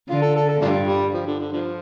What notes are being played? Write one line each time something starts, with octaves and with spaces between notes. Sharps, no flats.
D3 F4
A4
A4
A4
G2 A3 D4 F4
G3
F3
D3
D3
D3 F3